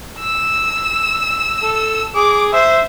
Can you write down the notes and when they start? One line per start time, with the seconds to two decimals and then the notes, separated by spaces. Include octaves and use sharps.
0.19 E6
1.63 A4
2.15 G#4 D6
2.53 C5 E5